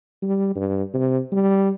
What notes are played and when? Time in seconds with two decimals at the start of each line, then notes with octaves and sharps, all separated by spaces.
0.22 G3
0.56 G2
0.94 C3
1.32 G3